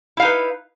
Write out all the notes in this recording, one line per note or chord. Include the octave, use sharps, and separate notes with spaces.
D#4 E4 B4 F5